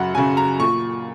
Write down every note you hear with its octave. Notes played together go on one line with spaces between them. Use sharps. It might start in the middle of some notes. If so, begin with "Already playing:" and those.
Already playing: F#2 C#3 F#3 F#5
C#3 F#3 G#5
A#5
A#2 C#6